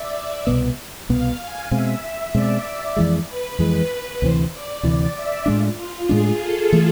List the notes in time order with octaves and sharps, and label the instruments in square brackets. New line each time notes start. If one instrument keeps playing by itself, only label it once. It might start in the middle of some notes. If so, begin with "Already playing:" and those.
Already playing: [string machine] D5 E5
[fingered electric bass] C2 B2 B3
[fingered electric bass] C2 B2 B3 [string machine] F5
[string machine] G#5
[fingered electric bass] B2 G#3 C4 [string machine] E5
[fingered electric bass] B2 G#3 C4 [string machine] D5
[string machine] D5
[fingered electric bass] F2 E3 G#3 [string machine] D5
[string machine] B4
[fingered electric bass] F2 E3 G#3
[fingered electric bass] D2 C3 E3 [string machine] C5
[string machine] D5
[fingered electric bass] D2 C3 E3 [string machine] D5
[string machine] E5
[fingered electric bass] A2 G#3 D4 [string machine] F4
[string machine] F4
[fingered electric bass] A2 G#3 D4 [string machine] G#4
[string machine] A4
[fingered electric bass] E3 A3